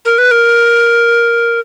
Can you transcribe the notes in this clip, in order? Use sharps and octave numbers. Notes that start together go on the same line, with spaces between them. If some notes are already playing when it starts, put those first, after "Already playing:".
A#4
B4
A#4